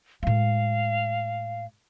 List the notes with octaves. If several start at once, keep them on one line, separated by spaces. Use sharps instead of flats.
A2 G#3 F5